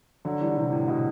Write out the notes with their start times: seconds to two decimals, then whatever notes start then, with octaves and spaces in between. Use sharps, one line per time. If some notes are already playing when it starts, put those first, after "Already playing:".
0.25 D3 F#3
0.41 E3 G3
0.56 C3 E3
0.72 A2
0.88 B2